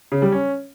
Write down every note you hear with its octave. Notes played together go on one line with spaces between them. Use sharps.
C#3
G3
C#4